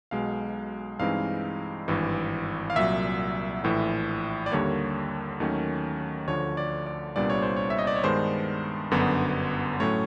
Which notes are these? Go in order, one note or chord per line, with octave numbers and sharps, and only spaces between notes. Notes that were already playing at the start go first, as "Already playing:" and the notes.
B1 B2 G#3 F5
G2 E3 G#3 C4 D#4 F5
G#1 G2 E3
F5
C2 A#2 F#3 E5
A#1 A2 E3
D5
D#2 D3 G3 A#3 C#5
D#2 D#3 F#3 A3 C#4
D2 D3 F3 C#5
D5
D5
C2 A#2 G3 B3 D4 D5
C#5
C5
C#5
E5
D#5
D5
C#5
G2 D#3 G#3 B3 D4 C5
G1 F#2 D3 F#3 B3
A2 F#3 A3 C#4 C#5